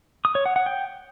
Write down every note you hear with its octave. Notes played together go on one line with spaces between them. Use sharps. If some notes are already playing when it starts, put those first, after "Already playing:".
D#6
C#5
F#5
F#5
G5